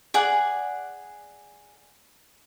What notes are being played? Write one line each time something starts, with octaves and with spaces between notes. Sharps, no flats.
G#4 D5 F#5